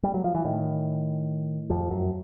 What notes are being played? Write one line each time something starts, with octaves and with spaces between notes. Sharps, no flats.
G3
F#3
F3
E3
A2 D#3
F2 F3
F#2 F#3